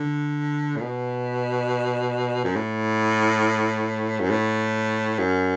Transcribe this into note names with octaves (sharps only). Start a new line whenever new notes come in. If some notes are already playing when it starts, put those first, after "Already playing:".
Already playing: D3
A2
B2
F#2
A2
F#2
A2
F#2